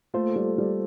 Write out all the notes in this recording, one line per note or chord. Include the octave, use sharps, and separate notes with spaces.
A3 A#3 F4 A4 C5
G3
G3